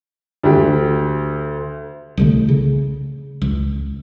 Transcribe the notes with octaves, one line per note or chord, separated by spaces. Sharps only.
D2 G4
C2 D3 A3
C#3
C#2